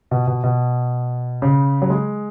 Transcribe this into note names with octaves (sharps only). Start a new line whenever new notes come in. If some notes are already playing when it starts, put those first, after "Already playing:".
B2
B2
B2
C#3
F#3
G#3